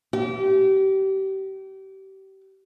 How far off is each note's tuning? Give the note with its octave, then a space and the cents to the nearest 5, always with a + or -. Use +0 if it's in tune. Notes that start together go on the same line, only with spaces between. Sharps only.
G4 -30